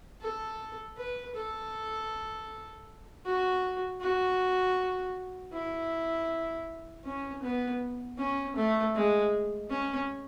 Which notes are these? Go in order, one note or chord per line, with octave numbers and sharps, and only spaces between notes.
A4
B4
A4
F#4
F#4
E4
C#4
B3
C#4
A3
G#3
C#4